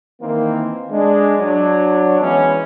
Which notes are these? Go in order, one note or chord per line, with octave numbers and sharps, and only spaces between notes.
D#3 E3 A#3 C4
G#3 D4
F#3 D4
E3 G#3 B3 C#4